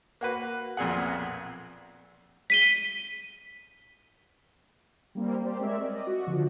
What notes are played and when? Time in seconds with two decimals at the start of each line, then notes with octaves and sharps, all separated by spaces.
0.21 A#3 F#4 B4
0.77 B1 F2 A#2 G#4 F#5
2.50 B6 D#7 G7
5.15 G3 A#3 C4
5.45 G4 C5 D5
5.60 G#3 C4 A#4 C#5 D5 E5
5.82 D5 D#5
6.07 F#4
6.27 D3 F3